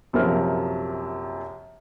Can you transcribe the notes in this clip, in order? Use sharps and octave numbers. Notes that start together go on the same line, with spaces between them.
A#1 F#2 C3 F3 A#4 F6